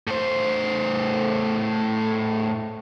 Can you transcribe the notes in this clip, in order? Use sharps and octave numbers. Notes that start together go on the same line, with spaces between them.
A2 C5